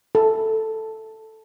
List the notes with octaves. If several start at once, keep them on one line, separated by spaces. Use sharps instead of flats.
A4